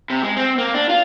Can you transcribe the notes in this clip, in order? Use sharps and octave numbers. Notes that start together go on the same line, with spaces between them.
C3
G#3
C4
A#3
D4
F4